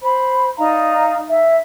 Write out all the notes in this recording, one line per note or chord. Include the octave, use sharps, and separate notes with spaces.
C5 B5
D#4 D5 F5 A#5
E5